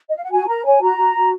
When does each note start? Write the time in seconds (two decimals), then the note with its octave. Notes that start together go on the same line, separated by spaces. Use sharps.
0.08 D#5
0.16 F5
0.24 F#5
0.31 F#4 G#5
0.48 A#4 A#5
0.65 C#5 G#5
0.82 F#4 A#5
0.98 F#4
1.16 F#4